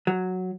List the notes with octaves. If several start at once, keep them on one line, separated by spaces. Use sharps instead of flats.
F#3